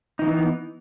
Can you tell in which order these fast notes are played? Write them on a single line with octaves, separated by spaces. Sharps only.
D#4 E3 B3